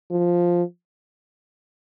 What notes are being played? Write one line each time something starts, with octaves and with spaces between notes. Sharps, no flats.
F3